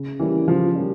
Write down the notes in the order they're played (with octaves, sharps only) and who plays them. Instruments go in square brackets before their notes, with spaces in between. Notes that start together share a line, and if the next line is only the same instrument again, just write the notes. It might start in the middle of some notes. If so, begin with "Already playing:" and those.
Already playing: [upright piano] C#3
[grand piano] E3 [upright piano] G3 A#3 C#4
[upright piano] C#3 [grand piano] F3
[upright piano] G3 A#3 C#4